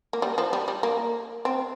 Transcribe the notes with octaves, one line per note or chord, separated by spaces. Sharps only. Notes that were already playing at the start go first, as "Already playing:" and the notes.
A#3
G3
F3
G3
G3
A#3
C4